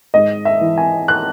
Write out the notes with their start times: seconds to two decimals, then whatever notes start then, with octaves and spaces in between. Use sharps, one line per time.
0.14 G#2 D#5
0.45 E5
0.61 E3
0.78 G#5
1.08 F#6